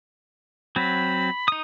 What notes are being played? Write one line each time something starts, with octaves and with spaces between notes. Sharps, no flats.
F#3 C4 B5
D#4 D#6